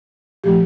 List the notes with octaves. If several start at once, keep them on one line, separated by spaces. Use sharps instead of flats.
A#2 F3 A3 G4